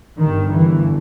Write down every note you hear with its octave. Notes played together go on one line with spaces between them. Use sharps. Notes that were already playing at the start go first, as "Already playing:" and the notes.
G1 G2 D#3
E3